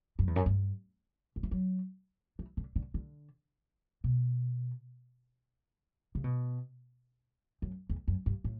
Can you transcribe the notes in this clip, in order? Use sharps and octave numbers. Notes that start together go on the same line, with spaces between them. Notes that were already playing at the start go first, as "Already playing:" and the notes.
F#2
E2
F#2
G2
F#3
E3
F#3
E3
D3
D3
D3
B2
C#3
B2
F#2
E2
F#2
G2
A2